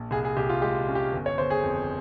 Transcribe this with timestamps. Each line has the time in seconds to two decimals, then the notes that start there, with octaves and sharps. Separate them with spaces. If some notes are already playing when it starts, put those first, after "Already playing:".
Already playing: A#1
0.11 C2 G#4
0.25 G#4
0.37 C2 G4
0.49 F4
0.62 G#3 G4
0.87 C#4
0.95 G4
1.12 G1
1.26 C#5
1.38 G1 C5
1.50 G#4
1.63 F2